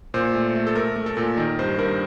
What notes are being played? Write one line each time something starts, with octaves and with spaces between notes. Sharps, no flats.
A#2 C5
A3
A3
A4
A3 A#4
A3
A4
A#2
D#3 A#4
G2 C5
G2 A#4